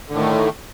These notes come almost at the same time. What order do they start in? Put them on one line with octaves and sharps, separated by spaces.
D3 A2 D#3 A3